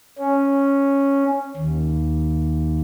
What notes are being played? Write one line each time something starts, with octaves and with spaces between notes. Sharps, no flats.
C#4
D#2